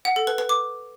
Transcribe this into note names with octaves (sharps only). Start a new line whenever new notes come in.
F#5
A4
B4
B4
D6